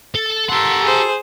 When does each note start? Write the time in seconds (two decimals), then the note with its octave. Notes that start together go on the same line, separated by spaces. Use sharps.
0.15 A4
0.49 G4 A4 A#4 F#5 C6
0.83 G#4 C5